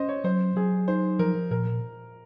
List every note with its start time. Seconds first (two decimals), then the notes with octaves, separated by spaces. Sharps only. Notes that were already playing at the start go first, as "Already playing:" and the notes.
Already playing: C#4 C5 D#5
0.09 C#5
0.24 F#3 C5
0.56 F#3 G#4
0.88 D#4 C5
1.19 F3 A#4
1.51 A#2 A#4